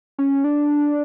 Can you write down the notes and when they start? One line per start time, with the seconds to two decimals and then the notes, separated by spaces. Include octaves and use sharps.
0.19 C#4
0.44 D4